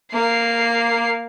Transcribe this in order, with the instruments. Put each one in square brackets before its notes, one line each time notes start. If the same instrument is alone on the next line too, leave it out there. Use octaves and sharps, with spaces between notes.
[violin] A#3 C7